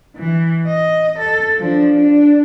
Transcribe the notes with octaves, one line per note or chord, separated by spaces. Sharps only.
E3
D#5
A4
F3 D4
D4